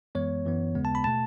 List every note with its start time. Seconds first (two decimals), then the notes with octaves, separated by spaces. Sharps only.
0.15 F#2 E3 G#3 B3 C#5
0.45 F#2 E3 B3
0.75 D#2 C#3 G#3 B3
0.85 A5
0.95 B5
1.04 B2 A3 A5